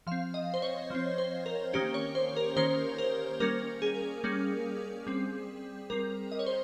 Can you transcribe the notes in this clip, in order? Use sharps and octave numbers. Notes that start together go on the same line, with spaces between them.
F3 C4 F5
D#5
C5
C#5
F3 C4
C5
A#4
D#3 A#3 C#4 G4
C#5
C5
A#4
D#3 A#3 C#4 C5
A#4
G3 A#3 C#4 A#4
G#4
G3 A#3 C#4
G3 C4
G3 C4 A#4
D#5
C#5
C5